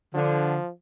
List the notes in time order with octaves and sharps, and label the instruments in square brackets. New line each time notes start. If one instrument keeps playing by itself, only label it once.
[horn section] D3 [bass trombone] F3